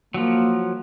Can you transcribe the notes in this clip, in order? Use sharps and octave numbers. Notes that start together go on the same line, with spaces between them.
F3 F#3 A#3